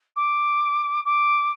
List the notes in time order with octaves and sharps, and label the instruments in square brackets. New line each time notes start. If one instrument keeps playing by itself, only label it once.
[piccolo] D6
D6